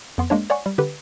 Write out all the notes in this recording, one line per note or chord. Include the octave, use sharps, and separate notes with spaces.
F2 B3 C6
G#3 A#3 D4 C#5
C#5 D5 F#5 G#5 C#6
G3
D3 G4 B4